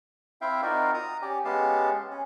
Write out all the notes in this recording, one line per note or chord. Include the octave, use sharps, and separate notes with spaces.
C4 E4 E5 F5 G5
C4 D#4 F4 F#4 A#4 D5
A#5 D#6
C#4 G4 D5
G#3 B3 C#4 G4 F5 A5
C#4